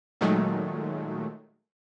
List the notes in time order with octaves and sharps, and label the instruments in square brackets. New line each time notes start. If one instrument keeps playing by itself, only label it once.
[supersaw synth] A#2 D#3 F#3 G#3 A3